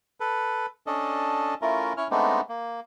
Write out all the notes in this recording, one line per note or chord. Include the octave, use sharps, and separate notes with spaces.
A4 B4
C#4 D4 A4 D#5
A3 C#4 E4 F4 A#4
C#4 E4 C#5 F6
G#3 A3 B3 C4 D4 D#4
A#3